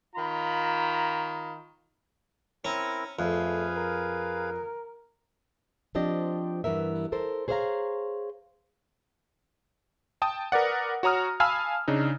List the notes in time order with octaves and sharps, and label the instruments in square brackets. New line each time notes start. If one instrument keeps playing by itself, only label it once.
[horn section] D#3 F4 A#5 B5
[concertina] C4 E4 A#4 [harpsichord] C#4
[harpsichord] F2 [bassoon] A3 [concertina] G#4 B4 F5
[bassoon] A#4
[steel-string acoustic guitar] F3 C4 D4 G4 D#5
G2 E3 B3 A#4 E5
A4 A#4 C5
G#4 C5 C#5 D#5 F5 A#5
[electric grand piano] G5 A5 D#6
A#4 B4 D5 F#5
F#4 C#5 A#5 D#6 F6
F5 G#5 A5 B5 E6 F6
C#3 D4 D#4